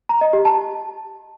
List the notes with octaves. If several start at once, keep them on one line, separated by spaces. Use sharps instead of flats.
A#5
D#5
G4
A5